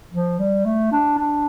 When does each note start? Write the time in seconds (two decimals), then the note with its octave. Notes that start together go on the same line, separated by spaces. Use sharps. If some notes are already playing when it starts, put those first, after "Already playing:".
0.13 F3
0.39 G3
0.65 A3
0.92 D4
1.18 D4